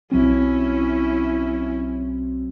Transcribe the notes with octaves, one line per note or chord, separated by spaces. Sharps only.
B1 F#3 C4 C#4 E4